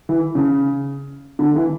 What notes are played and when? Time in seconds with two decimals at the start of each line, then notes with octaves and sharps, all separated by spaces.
0.09 E3
0.35 C#3
1.39 D3
1.56 E3